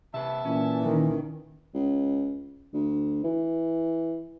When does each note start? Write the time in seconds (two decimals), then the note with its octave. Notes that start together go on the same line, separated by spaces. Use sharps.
0.14 C3 B4 E5 A5
0.45 A#2 E3 C#4
0.82 D#3
1.74 C#2
2.73 D2
3.24 E3